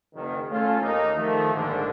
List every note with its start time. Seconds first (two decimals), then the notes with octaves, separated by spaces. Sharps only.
0.14 F#1 D#3
0.51 A3 C#4 F4 A4
0.81 D#2 A#3 D#4
1.16 D#3 F3 A3
1.53 A#1 G#2 D3